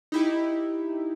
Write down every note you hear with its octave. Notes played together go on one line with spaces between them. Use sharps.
D#4 E4 G4